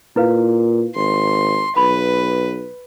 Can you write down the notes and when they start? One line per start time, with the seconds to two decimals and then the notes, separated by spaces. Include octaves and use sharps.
0.16 A#2 E4 B4 F5
0.95 G#1 C6
1.77 B1 B4 B5